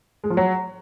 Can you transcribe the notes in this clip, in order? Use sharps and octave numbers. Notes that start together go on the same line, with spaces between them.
G#3
F3
F#3